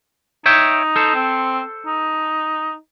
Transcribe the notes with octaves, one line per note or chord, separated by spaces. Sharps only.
D#4 C#5 E5 G5
A4 C5
C4
D#4